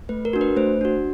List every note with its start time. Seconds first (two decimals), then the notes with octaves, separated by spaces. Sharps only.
0.09 A3 B4
0.25 A#4
0.33 D4 F#4
0.41 B4
0.56 A3 C5
0.81 D4 F#4